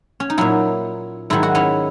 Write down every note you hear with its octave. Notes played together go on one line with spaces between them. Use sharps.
C#4
D#4
A#2 F#3 C#4 E4
G#2 D#3 F#3 E4
F#4
C#4 E4